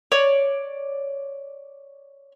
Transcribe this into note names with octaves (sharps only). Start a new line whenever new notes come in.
C#5 D5